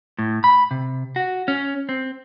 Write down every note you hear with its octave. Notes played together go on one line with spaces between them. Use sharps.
A2
B5
C3
F#4
C#4
C4